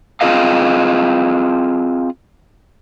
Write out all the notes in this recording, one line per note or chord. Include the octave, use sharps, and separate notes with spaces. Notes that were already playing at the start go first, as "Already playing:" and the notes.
C4 F4 G#4 D#5 F5